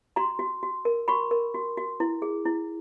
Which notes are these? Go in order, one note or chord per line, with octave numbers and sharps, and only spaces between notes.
F#4 A#5 C6
F#4
F#4
A#4
F#4 B5 C#6
A#4
F#4
F#4
E4
G#4
E4